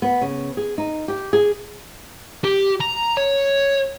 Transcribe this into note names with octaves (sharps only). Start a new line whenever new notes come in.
B3
C#3
G#4
D#4
G4
G#4
G4
A#5
C#5